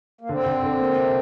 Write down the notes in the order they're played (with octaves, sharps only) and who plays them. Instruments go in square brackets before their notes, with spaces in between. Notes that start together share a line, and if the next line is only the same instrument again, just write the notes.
[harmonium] A#3
[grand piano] D3 [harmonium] C4
[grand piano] D3
D3
A#3
C3